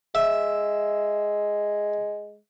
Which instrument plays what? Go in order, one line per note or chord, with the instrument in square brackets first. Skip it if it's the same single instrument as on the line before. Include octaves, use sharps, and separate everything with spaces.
[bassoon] G#3 [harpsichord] E5